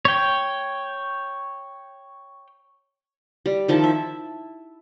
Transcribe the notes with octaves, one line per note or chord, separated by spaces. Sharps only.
C#5 G5
G3
D#3 F3 E4 A5
E5